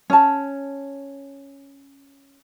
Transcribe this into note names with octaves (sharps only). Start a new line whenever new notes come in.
C#4 A5